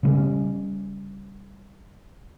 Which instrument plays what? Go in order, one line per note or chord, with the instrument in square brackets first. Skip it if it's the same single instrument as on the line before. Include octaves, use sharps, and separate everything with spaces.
[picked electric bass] C#3 G3 C#4